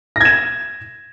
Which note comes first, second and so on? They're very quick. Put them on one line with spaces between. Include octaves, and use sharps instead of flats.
A#6 G#6 E7